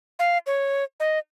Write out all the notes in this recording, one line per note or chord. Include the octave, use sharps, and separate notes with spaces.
F5
C#5
D#5